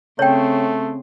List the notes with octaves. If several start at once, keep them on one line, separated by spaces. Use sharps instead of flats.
C#3 A3 C4 C#5 G5